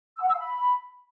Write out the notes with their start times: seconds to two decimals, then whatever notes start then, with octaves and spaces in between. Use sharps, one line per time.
0.17 E6
0.22 F#5
0.28 E6
0.33 F5
0.39 B5